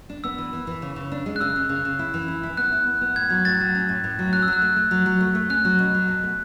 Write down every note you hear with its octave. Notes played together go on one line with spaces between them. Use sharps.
D4
B3 E6
E3
E3
E3
C#3
C#3
D4
G#3
F#6
C#3 E6
C#3
C#3
C#3
E4
E3
E4
E4
B3 F#6
E4
B3
B3
A2 G#6
F#3
A2 A6
F#3
C#4
A2
A2
F#3
C#4 F#6
E6
F#3
F#6
A3
A3
F#3
F#3
A3
A3
C#4 F#6
F#3
B2
F#3
B2
A3